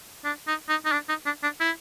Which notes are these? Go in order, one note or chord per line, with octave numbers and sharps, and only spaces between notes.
D4
D#4
D#4
D#4
D4
D#4
D4
D4
E4